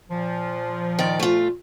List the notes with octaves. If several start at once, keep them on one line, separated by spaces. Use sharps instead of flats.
A#2 F3
D#3 D5
A3 F4